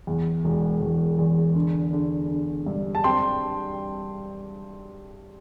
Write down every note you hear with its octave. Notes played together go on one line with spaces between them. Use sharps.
E2
E1
E1
E2
D3
D3
D3
G2
A5
C4 G5 C6